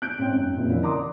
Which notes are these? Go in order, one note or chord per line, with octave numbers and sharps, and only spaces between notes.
F#6 G6 D7
G#1 C4 C#4 G5
F#2
F1 A#1
D3 E3 F3 C#4 E4 A#4
D5 A#5 C6 D6 D#6